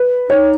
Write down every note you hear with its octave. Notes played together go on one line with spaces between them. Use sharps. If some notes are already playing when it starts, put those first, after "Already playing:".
Already playing: B4
D#4 C#5